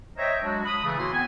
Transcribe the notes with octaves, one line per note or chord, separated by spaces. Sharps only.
C5 C#5 D#5 E5 G5 A#5
F#3 G#3 D4 F#4
B5 D#6
C#3 E3 A3
A2 A#3 E4 F#4 A5 C6
B3 C4 G#5